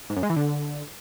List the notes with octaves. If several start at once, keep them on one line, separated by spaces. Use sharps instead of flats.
G#2
F#2
G#3
E3
D3